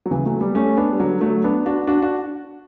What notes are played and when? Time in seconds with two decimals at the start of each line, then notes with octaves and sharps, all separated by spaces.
0.06 F#3
0.11 C#3 E3
0.25 F#3 A3
0.40 G3 B3
0.55 A3 C#4
0.77 B3 D4
0.93 G3
1.00 D3 F#3
1.21 F#3 A3
1.44 B3 D4
1.66 D4 F#4
1.87 D4 F#4
2.02 D4 F#4